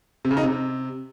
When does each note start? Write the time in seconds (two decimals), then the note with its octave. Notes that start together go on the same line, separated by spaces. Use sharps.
0.25 C3
0.31 C#3
0.37 D#4
0.43 C3